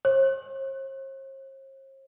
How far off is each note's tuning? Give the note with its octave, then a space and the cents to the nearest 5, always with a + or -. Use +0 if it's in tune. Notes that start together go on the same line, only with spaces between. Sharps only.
C5 +45